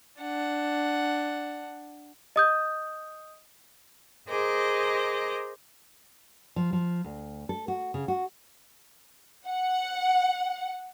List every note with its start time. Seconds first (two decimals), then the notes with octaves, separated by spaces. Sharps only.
0.21 D4 F#5
2.36 D#5 D#6 G6
4.30 G#4 A#4 C5 D#5 D6
6.56 F3
6.73 F3
7.04 D2
7.49 A4
7.68 F#4
7.94 C#3
8.08 F#4
9.47 F#5